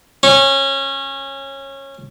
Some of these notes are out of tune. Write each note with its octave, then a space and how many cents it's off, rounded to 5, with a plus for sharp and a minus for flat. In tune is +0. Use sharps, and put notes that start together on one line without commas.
C#4 -20